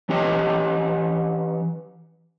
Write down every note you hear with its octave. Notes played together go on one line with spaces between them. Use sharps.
E3 C#4 G4 C#5 D#5